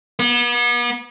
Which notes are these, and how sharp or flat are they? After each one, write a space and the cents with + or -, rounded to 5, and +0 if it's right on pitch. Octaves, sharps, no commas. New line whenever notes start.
B3 -40